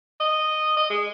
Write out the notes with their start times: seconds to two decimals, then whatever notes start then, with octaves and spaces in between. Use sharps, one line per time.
0.20 D#5
0.77 D#5
0.90 G#3